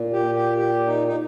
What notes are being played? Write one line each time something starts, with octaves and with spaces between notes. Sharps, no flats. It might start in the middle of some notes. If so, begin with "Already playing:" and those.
Already playing: A#2
G4
G4
G4
D#4
D#4